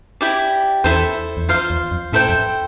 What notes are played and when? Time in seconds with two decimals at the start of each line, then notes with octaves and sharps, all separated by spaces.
0.21 E4 G4 D5 G5
0.84 E2 E4 A4 C5
1.37 E2
1.48 F2 F4 C5 F5
1.70 E2
1.91 F2
2.13 A2 E4 A4 C5 G5
2.29 F2